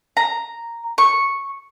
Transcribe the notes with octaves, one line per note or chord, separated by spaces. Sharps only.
A#5
C#6